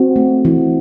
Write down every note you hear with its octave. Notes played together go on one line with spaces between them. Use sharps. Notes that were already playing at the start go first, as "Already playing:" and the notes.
Already playing: C4 F#4
A3
E3